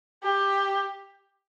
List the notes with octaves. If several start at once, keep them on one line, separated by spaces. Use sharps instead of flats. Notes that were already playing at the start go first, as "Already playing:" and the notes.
G4